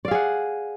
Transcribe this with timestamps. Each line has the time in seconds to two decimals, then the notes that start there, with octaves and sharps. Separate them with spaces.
0.05 D5
0.08 F5
0.11 G#4
0.15 F#5